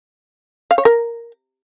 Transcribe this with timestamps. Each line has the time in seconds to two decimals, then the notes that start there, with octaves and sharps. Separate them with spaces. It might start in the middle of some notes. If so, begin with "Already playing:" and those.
0.71 F5
0.78 C#5
0.85 A#4